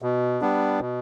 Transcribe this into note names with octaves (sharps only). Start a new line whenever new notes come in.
B2
G3 B3 D4
B2